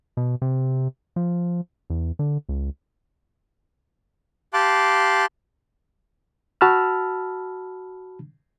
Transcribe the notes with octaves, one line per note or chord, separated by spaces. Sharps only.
B2
C3
F3
E2
D3
C#2
G4 F5 A5 C6 D6 F#6
F#4 A5 B5 E6 F6